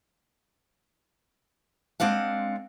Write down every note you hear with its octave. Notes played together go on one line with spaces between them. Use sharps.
G#3 C4 D4 F5 F#5